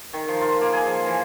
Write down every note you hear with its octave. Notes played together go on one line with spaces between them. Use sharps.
D#3
F3
F4
A#3
G#4
F3
E3